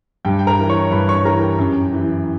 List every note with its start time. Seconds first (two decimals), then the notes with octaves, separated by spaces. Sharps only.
0.25 G2 G4 G5
0.39 G5
0.47 A#4 A#5
0.59 E3
0.69 C#5 C#6
0.91 G2 B4 B5
1.09 C#5 C#6
1.25 E3 A#4 A#5
1.42 G4 G5
1.59 F#2
1.93 E3